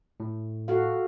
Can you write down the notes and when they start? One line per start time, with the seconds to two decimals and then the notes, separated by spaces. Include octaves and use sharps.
0.20 A2
0.68 F#4 A4 F5